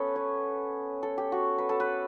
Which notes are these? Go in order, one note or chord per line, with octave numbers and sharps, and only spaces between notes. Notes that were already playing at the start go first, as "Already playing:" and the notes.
Already playing: B3 C#4 A4 B4
C#5
A4
G4
F#4
B4
A4
B4